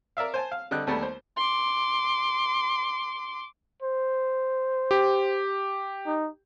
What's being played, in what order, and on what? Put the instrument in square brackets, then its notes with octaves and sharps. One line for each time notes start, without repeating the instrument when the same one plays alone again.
[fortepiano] A#4 D5 E5 F5
C5 G#5 A5
F5
D3 G3 C4 D#5 F#6
D#2 G3 A3 B3 A5
C5
[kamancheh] C6 D6
[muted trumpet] C5
[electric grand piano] G4
[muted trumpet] D#4